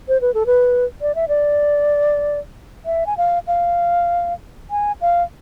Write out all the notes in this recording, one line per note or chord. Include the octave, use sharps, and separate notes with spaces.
C5
B4
A4
B4
D5
E5
D5
E5
G#5
F5
F5
G#5
F5